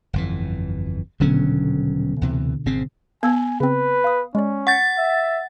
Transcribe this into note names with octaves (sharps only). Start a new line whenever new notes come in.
G1 F2 E3
D#1 B2 D3 F#3 C#4
D2 C3 E3
G#1 C#3 C4
B3 F5 G#5 E6 G#6
C#3 C4 B4
F5 D#6
G#3 C#4 D5
F#5 C#6 G6 A6 C#7
E5